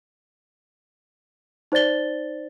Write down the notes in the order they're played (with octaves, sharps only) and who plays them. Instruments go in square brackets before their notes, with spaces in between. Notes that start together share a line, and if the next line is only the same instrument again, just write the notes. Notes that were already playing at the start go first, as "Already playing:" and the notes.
[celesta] D#4 C5 D5 A6 G7